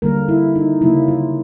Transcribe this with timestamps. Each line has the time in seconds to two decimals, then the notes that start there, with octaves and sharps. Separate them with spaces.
0.02 D3 G3 A#3 A#4
0.28 E4
0.55 D#4
0.81 C#3 F#3 A#3 E4
1.08 F4